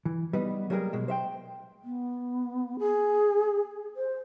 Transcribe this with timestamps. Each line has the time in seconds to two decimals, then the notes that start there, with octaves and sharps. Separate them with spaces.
0.05 E3
0.33 G3 B3 D#4
0.70 F#3 G3 A#3 E4 G#4 A#4
0.93 B2 G#3
1.08 C5 E5 G5
1.84 B3
2.79 G#4
3.96 C5